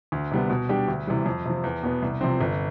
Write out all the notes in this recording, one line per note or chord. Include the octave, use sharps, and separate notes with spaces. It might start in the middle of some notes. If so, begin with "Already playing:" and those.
D2
C3 G3 B3
B2
G3 D4 G4
D2
C3 E3 G3
F2
C3 F3
E2
B2 B3
C2
C3 F3 C4
G1